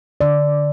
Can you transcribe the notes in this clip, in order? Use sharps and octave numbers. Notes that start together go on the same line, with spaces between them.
D3 D5